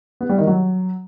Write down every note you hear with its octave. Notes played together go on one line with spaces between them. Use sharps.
B3
G3
D#3
F#3